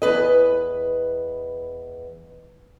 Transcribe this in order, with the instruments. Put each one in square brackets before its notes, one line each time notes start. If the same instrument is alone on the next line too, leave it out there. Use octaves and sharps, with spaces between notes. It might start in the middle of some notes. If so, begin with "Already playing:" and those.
[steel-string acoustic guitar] E2 B4 D#5